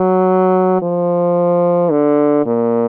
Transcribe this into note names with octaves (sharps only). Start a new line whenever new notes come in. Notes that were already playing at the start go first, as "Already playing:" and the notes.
Already playing: F#3
F3
D3
A#2